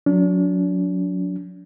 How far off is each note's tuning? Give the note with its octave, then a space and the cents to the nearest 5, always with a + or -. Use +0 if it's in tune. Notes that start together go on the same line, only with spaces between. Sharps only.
F#3 -25 D4 -40